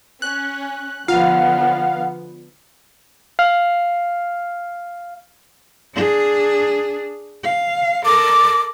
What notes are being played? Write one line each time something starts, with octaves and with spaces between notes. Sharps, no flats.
C#4 F#6
D3 F3 B3 F4 F5 F#5
F5 F6
D4 G#4
F5
A4 A#4 D6